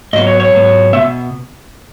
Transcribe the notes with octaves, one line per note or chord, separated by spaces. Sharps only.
G#2 F#3 B3 D#5
C#5
C#5
G#2 F#3 B3
B2 G#3 B3 E5